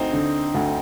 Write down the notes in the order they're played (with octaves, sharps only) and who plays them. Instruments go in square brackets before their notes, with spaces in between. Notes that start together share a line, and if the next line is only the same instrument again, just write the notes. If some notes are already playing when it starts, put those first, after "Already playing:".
Already playing: [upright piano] D2 [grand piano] C4 D#4
[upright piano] D3
D2